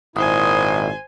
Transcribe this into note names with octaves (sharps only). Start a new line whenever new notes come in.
G#1 A#2 E4 C5 G#5 D#6